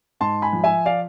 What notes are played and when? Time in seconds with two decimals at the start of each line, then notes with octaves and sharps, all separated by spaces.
0.20 G#2 A5 C6
0.42 G#5 B5
0.53 F3
0.64 E5 G#5
0.86 D5 F5